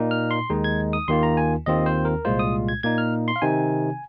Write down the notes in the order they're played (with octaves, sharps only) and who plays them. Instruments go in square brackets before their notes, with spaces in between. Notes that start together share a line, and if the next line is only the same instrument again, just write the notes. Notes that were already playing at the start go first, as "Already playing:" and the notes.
Already playing: [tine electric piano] A#2 A#3 D#4
F6
C6
D#2 D#3 G#3 D#4
G#6
D#6
D#2 D#3 A#3 F4 C6
A#5
G#5
D#2 D#3 C4 F4 D#5
C5
A#4
C2 A#2 G#3 F4 C5
D#6
G#6
A#2 A#3 D#4 G#6
F6
C6
F5
C3 D#3 C4 D#4 G#5